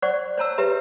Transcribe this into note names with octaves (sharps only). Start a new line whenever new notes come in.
C5 D5 F#5 C#6
C5 C#5 A5 A#5 E6
G4 B4 C#5 E5 A#5